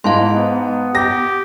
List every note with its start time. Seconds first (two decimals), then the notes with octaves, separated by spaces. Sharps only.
0.04 G#2 E4 F5 A5 C6
0.33 B3
0.95 G4 A#6